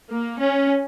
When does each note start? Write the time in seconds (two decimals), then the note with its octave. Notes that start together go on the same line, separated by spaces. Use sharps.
0.12 A#3
0.40 C#4